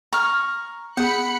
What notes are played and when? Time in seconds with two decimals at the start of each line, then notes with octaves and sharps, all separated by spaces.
0.13 A#5 C#6 F6
0.97 B3 G#4 F#5 B5 F#6 C#7